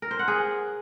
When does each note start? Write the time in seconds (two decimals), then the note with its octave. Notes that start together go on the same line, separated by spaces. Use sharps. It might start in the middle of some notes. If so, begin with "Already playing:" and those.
0.02 A#4
0.11 C5
0.19 F#5
0.28 G#4